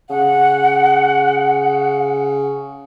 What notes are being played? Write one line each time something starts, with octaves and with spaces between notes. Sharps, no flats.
C#3 F#5